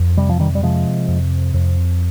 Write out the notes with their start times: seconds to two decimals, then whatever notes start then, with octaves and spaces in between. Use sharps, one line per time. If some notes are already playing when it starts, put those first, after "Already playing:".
Already playing: F2
0.17 C3 G3
0.29 F3
0.40 D#3 G3
0.55 G3
0.63 C3 F3 G#3
1.08 F2
1.54 F2